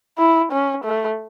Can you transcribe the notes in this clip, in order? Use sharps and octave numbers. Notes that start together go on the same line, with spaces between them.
E4
C#4
A3